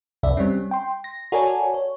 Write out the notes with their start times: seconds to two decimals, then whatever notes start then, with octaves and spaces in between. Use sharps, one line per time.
0.23 C2 F2 C3 D5 E5
0.37 G3 C4 C#4
0.71 G5 C6
1.04 A#6
1.32 F#4 A4 A#4 C#5 D5 G#5
1.74 C#5